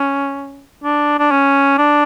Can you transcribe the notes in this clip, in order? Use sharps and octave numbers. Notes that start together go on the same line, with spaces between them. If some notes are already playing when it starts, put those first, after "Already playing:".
Already playing: C#4
D4
D4
C#4
D4